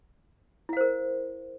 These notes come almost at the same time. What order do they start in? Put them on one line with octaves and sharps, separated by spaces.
E4 F5 C5 A#4